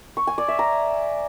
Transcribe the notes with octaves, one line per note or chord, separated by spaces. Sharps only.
C#6
G#5
D5
E5
A#5